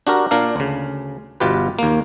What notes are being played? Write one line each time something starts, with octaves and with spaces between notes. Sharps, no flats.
D4 F#4 G4 A#4
A#2 D4 A#4 F5
D2 C#3
G1 B2 F4 G4 B4
D#2 A#3